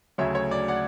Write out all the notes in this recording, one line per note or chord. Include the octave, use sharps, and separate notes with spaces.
D2 C#3 F#3 A3 C#5 E5
C#5
D5
D5 F#5